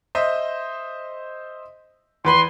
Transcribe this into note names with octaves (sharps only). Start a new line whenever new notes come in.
C5 D#5 E5
E2 B4 B5 C6